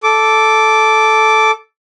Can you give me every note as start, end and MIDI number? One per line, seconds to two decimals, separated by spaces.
0.03 1.51 69
0.03 1.51 86